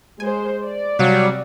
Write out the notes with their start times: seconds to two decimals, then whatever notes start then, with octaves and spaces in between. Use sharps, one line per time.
0.20 G#3 C5 G#5
0.64 D5
0.99 C3 F#3 G3 F5